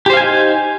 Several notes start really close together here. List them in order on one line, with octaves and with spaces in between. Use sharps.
G4 C5 F5 G#5 D#4